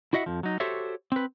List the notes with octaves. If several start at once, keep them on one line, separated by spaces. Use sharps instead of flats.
E4 F#4 D#5 E5 F#5
F2 F3
F#3 D#4
F#4 G4 A4 C5 C#5 E5
C4 B4